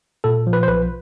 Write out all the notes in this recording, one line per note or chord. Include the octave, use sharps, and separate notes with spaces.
A#2 A4
F3
B4
C5
B1 B4